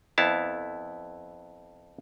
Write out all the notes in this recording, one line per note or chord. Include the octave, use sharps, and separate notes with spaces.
F2 B3 E4 F5 A5